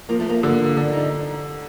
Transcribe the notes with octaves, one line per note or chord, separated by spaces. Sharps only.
F3 A#3
A3
A#3
D3 A#3
D3 D4
D#4